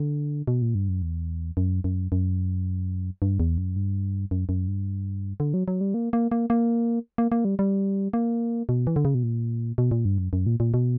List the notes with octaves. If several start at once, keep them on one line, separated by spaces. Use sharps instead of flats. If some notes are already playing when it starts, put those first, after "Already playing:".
Already playing: D3
B2
A#2
G2
F#2
E2
F#2
F#2
F#2
G2
E2
F#2
G2
F#2
F#2
G2
D3
F#3
F#3
G3
A#3
A#3
A#3
A#3
A#3
A#3
G3
G3
A#3
B2
E3
D3
C#3
B2
A#2
B2
A#2
G2
F#2
F#2
A#2
A#2
B2